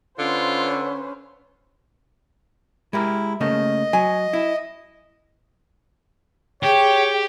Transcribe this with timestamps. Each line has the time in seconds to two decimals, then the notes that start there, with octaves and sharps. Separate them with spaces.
0.19 D3 C#4 F4 B4 C5
2.93 G#3 E4 G4 A#4
3.41 C#3 A3 A#3 D#5
3.93 F#3 G#5
4.33 E4
6.63 G4 G#4 C#5 G5